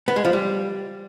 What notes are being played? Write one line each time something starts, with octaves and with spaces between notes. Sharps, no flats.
B3
G#3
F3
G3